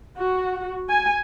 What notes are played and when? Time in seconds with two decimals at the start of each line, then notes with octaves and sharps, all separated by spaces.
0.17 F#4
0.89 G#5